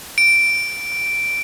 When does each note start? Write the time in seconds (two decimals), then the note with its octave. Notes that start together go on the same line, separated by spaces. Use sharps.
0.18 D7